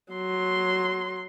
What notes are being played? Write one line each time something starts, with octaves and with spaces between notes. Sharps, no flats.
F#3 C6